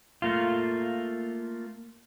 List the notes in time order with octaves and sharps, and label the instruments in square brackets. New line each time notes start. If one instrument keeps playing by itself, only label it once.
[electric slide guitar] A3 A#3 F4